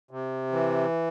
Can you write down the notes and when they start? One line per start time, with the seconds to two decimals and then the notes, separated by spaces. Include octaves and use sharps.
0.11 C3
0.52 E3